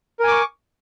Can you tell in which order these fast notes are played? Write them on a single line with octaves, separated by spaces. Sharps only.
A#4 G#5 D6 C#6